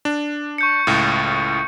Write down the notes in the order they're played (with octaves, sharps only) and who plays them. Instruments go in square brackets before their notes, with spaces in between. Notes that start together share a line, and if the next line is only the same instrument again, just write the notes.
[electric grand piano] D4
[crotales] C#6 G6 C#7
[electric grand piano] C#2 A2